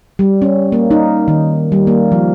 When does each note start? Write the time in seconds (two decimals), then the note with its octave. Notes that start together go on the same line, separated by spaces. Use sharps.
0.19 G3
0.42 C#4
0.72 A#3
0.91 D#4
1.28 D#3
1.72 G3
1.87 A#3
2.12 F3